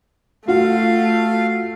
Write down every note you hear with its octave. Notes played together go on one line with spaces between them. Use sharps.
A3 F4 F#4 F5